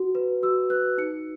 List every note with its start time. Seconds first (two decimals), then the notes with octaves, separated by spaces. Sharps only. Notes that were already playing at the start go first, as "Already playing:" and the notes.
Already playing: F#4
0.15 B4
0.43 F#4 E6
0.70 B4 F#6
0.98 D#4 C#7